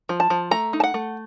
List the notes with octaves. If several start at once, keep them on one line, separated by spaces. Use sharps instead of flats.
F3
A5
F3
A3 A#5
D#4
A5
F#5
A3